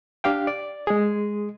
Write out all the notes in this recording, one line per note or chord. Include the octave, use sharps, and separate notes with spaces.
D4 G4 F5 G5
D5
G#3 G#4